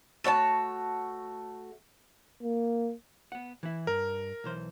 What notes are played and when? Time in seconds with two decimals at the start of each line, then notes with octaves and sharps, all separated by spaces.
0.24 A3 F#4 C#5 A5
2.42 A#3
3.32 B3 F#5
3.63 E3 E4
3.87 G2 A#4
4.44 B1 E3 C5